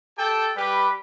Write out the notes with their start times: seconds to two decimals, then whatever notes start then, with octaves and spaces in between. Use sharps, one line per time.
0.17 G4 A4 G5 A5
0.56 G3 G4 B4 B5